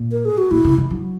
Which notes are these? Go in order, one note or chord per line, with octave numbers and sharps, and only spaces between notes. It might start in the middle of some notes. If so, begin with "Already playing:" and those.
Already playing: A#2
A#4
G#4
F#4
A#2 E4
C#3
D#3
F#3